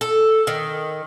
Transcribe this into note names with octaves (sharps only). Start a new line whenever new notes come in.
A4
D#3